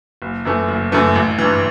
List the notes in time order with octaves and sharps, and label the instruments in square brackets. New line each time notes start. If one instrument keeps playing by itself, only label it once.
[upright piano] F#1
F#2 E3 A3
F#1
F#2 E3 A3
A1
G2 E3